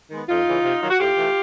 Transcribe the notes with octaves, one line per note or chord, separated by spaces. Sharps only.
D#3 G#3 B3
F2 D#4 F4
C#3 E3
C3
D#3 F#3 F4
F#4
A2 F4 G4
E3 A3